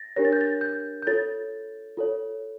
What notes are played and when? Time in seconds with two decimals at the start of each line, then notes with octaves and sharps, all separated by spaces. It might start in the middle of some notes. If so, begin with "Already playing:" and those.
Already playing: A6 A#6
0.16 D4 G4 A#4 C#5 A#6
0.25 A6
0.33 G6
0.41 A6
0.61 G6
1.02 G6
1.07 F4 A4 C#5 A6
1.97 F4 A4 C#5